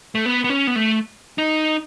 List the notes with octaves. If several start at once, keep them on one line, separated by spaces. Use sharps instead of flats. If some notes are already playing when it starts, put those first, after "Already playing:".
A3
B3
B3
C#4
B3
A3
D#4